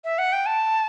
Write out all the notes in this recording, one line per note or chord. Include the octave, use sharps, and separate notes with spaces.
E5
F#5
G5
A5